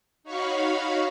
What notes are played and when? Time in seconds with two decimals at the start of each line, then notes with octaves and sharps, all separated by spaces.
0.24 D#4 F#4 C#5 F5 B5 C#6